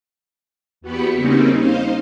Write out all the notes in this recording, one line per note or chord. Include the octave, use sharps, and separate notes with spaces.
E2 B3 F#4 G4 B5 C#7
C#3 G3 A#3 C4 C#4 D#4
D#4 C5 D#5 F5